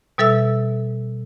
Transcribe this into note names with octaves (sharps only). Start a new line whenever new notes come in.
B2 G3 A4 E5 E6